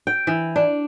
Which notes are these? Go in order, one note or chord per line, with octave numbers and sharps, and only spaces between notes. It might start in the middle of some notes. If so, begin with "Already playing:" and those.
G5
E3
D4